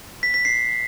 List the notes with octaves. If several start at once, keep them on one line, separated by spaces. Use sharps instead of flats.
B6
B6
C7